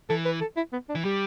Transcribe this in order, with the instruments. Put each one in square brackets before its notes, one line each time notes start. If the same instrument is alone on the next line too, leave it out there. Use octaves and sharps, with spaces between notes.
[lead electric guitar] E3 [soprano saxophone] A4
[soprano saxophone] B4
A4
E4
B3
D4
[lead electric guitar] E3
[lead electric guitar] G3 [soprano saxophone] G4